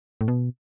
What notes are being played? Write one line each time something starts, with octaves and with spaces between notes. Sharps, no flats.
A2
B2